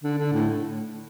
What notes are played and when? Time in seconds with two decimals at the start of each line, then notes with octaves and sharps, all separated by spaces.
0.04 D3
0.18 D3
0.33 A2